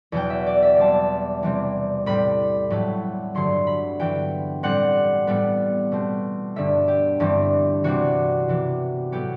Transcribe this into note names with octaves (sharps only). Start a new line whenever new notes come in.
E2 B2 F#3 B3 G5
E5
D5
E5
B2 G3 C4 A5
C3 E3 G3 C4
A2 G3 C4 B5
A2 F#3 A3
G2 D3 F#3 A3 C6
B5
G2 E3 B3 G5
A2 G3 C4 F#5
A2 G3 B3
B2 A3 C4
G2 D3 G3 B3 E5
G4
G2 E3 G3 C4
C3 E3 G3 C4 F#4
C3 E3 B3
A2 F#3 B3 G4